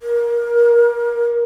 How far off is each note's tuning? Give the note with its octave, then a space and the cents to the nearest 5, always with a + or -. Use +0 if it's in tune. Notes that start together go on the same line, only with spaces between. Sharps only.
A#4 +25